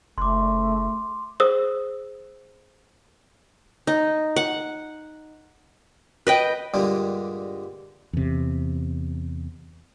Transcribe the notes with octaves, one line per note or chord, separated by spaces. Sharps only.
F#1 A3 C6 D6
G#4 C5 D#6 E6
D#4
F#5
B4 D#5 G5
G2 A#2 D3 G3 G#3 A#3
E2 C3